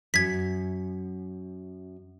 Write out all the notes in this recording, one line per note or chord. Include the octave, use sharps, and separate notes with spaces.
F#2 G#6 B6